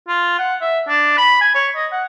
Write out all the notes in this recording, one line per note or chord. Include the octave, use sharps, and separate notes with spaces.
F4
F#5
E5
D4
B5
G#5
C#5
D#5
F#5